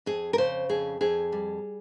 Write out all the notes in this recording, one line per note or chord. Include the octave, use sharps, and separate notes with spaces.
F2 G#4
A#4
C#3 C5
F2 G#4
F2 G#4
G3